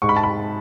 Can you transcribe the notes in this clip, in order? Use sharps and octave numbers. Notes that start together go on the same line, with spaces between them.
G#2 C#6
B5
A5
B5